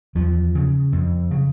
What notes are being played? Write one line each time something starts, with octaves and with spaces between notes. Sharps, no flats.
E2 F3
C#3
F2
C#3